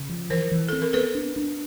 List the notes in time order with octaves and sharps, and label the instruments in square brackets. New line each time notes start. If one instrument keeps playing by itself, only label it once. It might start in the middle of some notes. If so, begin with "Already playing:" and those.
Already playing: [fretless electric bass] C#3
F3
[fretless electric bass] E3 [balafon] A#4 C5
[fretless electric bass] E3
[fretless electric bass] C4 [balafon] A4
[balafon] A#4
[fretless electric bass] B3 [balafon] A4 B4
[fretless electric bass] D4
D4